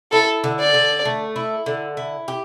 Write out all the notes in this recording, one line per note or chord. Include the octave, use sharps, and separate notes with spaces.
E4 A4
D3
D5
D3
A3
E4
D3
E4
G4